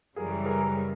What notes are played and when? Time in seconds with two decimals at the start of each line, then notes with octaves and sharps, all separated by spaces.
0.16 F#2 C#3 E3 G3 G#4 A#4
0.45 G#4 A#4